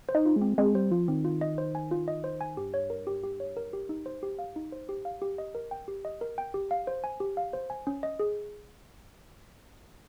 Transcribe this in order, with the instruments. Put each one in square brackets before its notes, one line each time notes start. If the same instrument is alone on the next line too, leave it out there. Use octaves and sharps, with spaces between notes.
[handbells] C5
[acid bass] D#4
[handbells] F4
[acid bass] G#3
[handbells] C4
[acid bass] G#3 [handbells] C4
[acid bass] G3 [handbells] C5
[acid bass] F3 [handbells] F4
[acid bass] D#3 [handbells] C4
[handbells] F4
D#5
C5
G#5
F4
D#5
C5
G#5
[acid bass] G2 [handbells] G4
[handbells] C#5
A#4
G4
G4
C#5
A#4
G4
[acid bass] G#2 [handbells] D#4
[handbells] C5
G4
F5
D#4
C5
G4
F5
[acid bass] A#2 [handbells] G4
[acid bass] G2 [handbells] D#5
[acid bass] C3 [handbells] A#4
[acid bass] C#3 [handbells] G5
[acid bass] C3 [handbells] G4
[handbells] D#5
A#4
G5
G4
F5
C5
G#5
[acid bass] G#2 [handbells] G4
[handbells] F5
C5
G#5
C#4
D#5
G#4